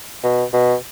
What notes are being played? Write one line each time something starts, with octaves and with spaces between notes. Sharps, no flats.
B2
B2